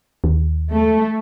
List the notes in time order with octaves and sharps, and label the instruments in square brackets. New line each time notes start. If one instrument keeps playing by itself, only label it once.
[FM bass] D#2
[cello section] A3